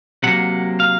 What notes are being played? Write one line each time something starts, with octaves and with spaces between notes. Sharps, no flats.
C3 F#3 A#3 F#5
F5